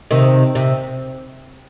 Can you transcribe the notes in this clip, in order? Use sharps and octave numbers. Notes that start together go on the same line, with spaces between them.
C3 D#3
C3